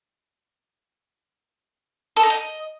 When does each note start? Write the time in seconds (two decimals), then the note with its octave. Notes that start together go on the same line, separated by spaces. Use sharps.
2.16 A4
2.23 D#4
2.30 D#5